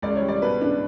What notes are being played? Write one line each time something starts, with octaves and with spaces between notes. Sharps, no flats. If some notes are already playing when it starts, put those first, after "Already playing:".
C#2 D5
C#5
G3
D5
B2 B4
D4